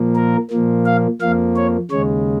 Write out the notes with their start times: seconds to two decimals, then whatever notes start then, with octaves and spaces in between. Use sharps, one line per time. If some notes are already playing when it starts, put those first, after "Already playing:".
Already playing: A#2 F3 A#3
0.15 A#4
0.51 A#2 F3 A#3
0.86 F5
1.21 F2 F3 A#3 F5
1.56 C#5
1.91 D#2 C#3 G#3 C#5